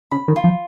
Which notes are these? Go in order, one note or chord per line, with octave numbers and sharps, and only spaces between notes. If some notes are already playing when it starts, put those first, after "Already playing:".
C#3 B5
D#3
F4
F3